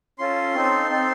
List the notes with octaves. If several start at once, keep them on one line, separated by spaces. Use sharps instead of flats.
C#4 F4 A4 C6
C4 D#4 A4
C4 D#4 A4